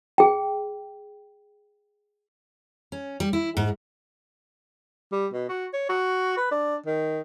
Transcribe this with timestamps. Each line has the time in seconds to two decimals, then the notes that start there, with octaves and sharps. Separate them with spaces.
0.18 G#4 G5
2.92 C#4
3.20 G3
3.33 E4
3.57 G#2
5.12 G3
5.33 B2
5.49 F#4
5.74 C#5
5.89 F#4
6.37 B4
6.51 D4
6.87 D#3